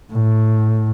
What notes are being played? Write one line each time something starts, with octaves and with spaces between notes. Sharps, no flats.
A2